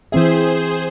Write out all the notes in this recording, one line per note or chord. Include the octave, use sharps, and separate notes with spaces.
E3 C4 G#4 C5 E5